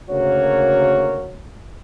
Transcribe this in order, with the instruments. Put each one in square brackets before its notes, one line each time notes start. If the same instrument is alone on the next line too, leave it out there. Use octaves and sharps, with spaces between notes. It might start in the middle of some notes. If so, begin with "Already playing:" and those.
[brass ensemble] D2 C#3 A#3 F#4 A#4 C#5